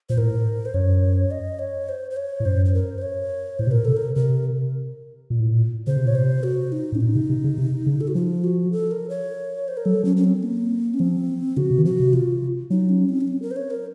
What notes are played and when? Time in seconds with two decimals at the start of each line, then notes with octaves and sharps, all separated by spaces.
0.10 A#2 C5
0.17 A2 A#4
0.65 C5
0.74 F#2 C#5
1.31 D#5
1.59 C#5
1.89 C5
2.11 C5
2.17 C#5
2.40 A2
2.45 F#2 C5
2.65 C5
2.74 A#4
2.98 C5
3.02 C#5
3.59 A2 C5
3.67 C3
3.71 A#2 A#4
3.85 C3 A4
3.97 A#4
4.15 C3 A#4
5.30 A#2
5.40 A2
5.51 A#2
5.87 C#3 C5
5.96 C3
6.06 A#2 C#5
6.14 C3 C5
6.43 F#4
6.72 D#4
6.92 A2 C#4
7.01 A#2 D#4
7.15 C3
7.29 C3
7.44 C#3
7.58 C3
7.86 C#3
8.01 A4
8.08 F#4
8.15 F3 F4
8.44 F#4
8.72 A4
8.91 A#4
9.10 C#5
9.68 C5
9.77 A#4
9.85 F#3 A4
10.04 F#3 C#4
10.17 C#4
10.24 C4
10.43 A#3
10.94 C#4
10.99 F3 C4
11.57 C#3 F#4
11.71 C3
11.78 D#3
11.85 F3 F#4
12.00 C3
12.13 F4
12.70 F#3 D#4
12.89 C#4
13.09 C4
13.21 C#4
13.27 C4
13.42 A#4
13.51 C5
13.56 C#5
13.70 A#4